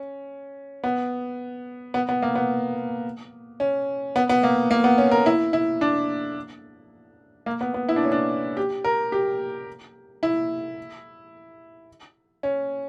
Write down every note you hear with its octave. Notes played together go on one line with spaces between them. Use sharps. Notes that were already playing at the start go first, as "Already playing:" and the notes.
Already playing: C#4
B3
B3
B3
A#3
B3
C#4
B3
B3
A#3
A#3
B3
C#4
A#4
E4
E4
D4
A#3
B3
B3
E4
D4
C#4
D4
G4
A#4
G4
E4
C#4